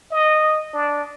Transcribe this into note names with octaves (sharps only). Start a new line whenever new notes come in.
D#5
D4